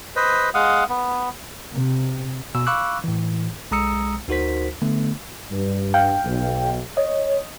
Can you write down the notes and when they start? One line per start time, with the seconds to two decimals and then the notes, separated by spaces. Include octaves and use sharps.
0.16 B4 C5 D#5
0.54 G#3 F5 F#5 D#6
0.89 B3
1.74 C3
2.55 B2 E6
2.67 F5 B5 C#6 D6 E6 F#6
3.04 A2 E3
3.71 B1 G#3 A#5 D#6 E6 C#7
4.28 D2 D#4 F#4 A#4 C5 B6
4.82 D3 A3 B3
5.52 G2
5.94 F5 G5
6.24 B1
6.97 C#5 D#5